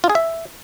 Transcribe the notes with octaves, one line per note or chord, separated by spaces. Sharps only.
F4
G#4
E5